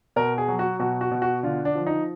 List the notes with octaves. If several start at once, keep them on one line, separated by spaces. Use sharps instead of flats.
B2 A#4
G#4
F#3
F#4
B2 F#4
F#4
B2
F#4
D3 F4
D4
F3
D#4